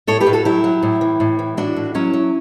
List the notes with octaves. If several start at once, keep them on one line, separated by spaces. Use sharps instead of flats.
A2 A4 C#5
G4 B4
A2
F#4 A4
F#3 E4 G4
F#3
A2
E3
A2
E3
A2 D4 F#4
A2
F#3 C#4 E4
F#3